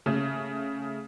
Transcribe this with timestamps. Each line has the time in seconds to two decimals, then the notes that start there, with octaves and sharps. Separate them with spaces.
0.06 C#3 A3